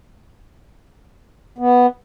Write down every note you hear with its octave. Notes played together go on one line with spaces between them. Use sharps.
B3